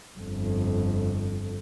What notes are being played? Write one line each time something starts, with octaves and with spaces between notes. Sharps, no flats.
G1 F2